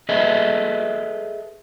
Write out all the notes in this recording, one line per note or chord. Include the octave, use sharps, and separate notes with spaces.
G#4 A4 B4 D#5 E5